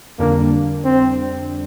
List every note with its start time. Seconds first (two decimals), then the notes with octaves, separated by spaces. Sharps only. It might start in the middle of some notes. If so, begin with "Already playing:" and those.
0.19 F2 D3 G3 A#3 D4
0.85 C4